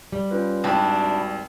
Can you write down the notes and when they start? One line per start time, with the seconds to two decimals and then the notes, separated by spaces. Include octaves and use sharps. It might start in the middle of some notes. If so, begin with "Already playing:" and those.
0.12 G3
0.31 C#4 F4 B4
0.64 G#1 D4 E4 F#4 G5 G#5 D6